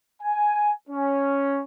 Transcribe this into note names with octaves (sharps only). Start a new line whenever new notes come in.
G#5
C#4